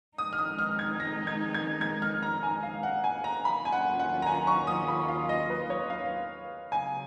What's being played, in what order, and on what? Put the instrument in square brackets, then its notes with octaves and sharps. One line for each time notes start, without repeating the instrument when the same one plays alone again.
[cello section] F2 D#3 G#3 D#4 [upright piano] D#6
[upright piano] F6
D#6
F6
G#6
A#6
G#6
G#6
G#6
F6
A#5
G#5
F5
F#5
G#5
A#5
[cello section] D#2 D#3 F#3 C#4 F4 [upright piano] B5
[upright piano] G#5
F#5
F#5
A#5
G#5
C#6
D#6
B5
F5
D#5
B4
C#5
F5
[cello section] C#3 F#3 B3 [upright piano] G#5